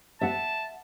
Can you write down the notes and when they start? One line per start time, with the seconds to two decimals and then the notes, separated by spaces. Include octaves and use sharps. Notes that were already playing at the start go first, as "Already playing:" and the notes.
0.21 E5 F#5 A5